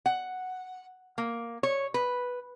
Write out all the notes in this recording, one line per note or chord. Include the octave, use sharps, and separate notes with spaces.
F#5
A#3
C#5
B4